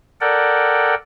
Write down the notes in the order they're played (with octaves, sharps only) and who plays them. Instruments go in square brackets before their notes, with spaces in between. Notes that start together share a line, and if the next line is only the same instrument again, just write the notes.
[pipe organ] A4 A#4 D5 F#5 G5